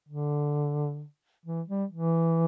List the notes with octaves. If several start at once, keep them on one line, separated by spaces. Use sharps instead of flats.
D3
E3
G3
E3